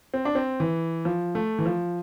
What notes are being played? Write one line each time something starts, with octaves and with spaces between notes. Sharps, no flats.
C4
D4
C4
E3
F3
A3
E3
F3